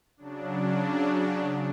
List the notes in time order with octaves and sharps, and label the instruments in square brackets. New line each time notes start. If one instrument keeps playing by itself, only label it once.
[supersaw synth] C#3 F#3 D4